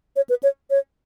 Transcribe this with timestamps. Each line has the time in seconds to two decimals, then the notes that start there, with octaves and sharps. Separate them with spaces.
0.16 C#5
0.29 B4
0.43 C#5
0.70 C#5